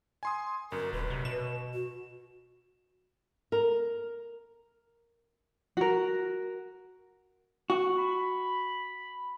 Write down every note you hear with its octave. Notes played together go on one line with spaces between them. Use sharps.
G#5 C6 D#6
G1 F#2 A#4
D#1 B4
C3
B2 E7
F#4
A#4
F#4 A#4
F#4
B5